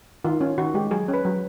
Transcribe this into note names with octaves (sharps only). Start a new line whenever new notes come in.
D#3 F4
C#4 F4
D#3 F#4
G#3 G4
F#3 G#4
C#4
B4
F#3